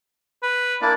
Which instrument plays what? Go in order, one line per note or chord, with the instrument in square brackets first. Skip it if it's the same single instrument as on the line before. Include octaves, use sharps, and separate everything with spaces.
[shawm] B4
[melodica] A#3 D4 E4 [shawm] D5